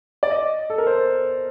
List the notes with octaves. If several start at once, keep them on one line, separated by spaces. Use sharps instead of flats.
D5
D#5
A4
A#4
C5